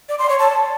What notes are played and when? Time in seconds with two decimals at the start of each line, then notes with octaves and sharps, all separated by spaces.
0.09 D5
0.19 C6
0.29 C#5
0.39 A5